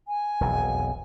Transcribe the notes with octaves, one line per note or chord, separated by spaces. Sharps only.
G#5
E1 B1 F2